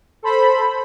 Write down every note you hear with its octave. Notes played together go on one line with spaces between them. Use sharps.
A4 C5 B5